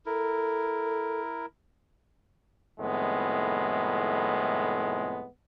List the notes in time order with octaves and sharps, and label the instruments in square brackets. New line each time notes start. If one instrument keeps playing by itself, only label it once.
[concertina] E4 A#4 [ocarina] A4
[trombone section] C2 F2 A2 D#3 G#3 B3